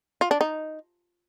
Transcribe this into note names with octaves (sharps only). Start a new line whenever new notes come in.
F4
D4
D#4